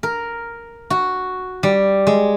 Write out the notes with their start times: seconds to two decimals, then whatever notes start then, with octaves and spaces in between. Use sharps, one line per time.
0.03 A#4
0.90 F#4
1.63 G3
2.07 G#3